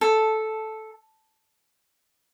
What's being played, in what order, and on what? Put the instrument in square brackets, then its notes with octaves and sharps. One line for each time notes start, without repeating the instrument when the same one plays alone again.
[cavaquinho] A4